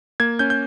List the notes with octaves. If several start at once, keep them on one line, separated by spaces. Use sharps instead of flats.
A#3 G#6
C#4 G6
G6